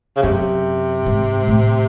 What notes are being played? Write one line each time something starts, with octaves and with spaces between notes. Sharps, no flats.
C#3
F#2 C3
G#2
A2